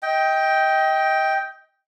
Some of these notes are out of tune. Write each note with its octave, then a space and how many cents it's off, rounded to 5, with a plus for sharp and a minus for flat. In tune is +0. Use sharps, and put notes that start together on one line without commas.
D#5 +30 G5 +0